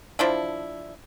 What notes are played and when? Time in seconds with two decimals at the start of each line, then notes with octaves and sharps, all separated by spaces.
0.19 F3 D4 E4